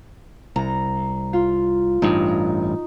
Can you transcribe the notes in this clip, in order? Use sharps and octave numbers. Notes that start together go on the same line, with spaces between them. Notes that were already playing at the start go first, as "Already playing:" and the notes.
C2 A#5
F4
A1 G2 D#4